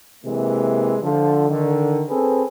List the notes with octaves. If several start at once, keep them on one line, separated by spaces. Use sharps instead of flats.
C3 E3 G#3 A#3
D3 F3
D3 D#3
C4 G#4 A4 B4